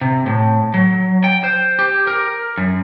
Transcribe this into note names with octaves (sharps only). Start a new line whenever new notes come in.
C3
A2
F#3
G5
C5
G4
A#4
F#2